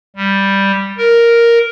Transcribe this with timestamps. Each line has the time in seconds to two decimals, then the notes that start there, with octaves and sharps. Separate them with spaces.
0.17 G3
0.97 A#4